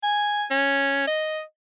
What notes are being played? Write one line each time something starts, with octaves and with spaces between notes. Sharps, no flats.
G#5
C#4
D#5